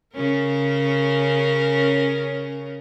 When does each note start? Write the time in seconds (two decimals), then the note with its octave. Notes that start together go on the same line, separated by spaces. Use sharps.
0.15 C#3 C#4 A#4